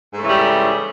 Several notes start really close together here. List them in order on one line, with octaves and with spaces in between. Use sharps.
G#2 A3 C#3 E3 G3